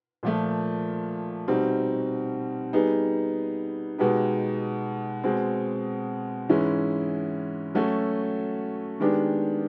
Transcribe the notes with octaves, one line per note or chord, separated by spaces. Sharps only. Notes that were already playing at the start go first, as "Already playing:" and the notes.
A#2 F3 A3
B2 G3 C4 D#4
G3 B3 D#4 G#4
B2 G#3 B3 D#4 G4
B2 G#3 C4
G#2 E3 G#3 C#4 E4
F#3 A3 C#4 F#4 A4
D#3 G#3 B3 D4 G4